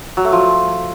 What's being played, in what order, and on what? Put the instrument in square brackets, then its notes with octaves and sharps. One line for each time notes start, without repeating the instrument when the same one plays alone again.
[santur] F#3
A3
F3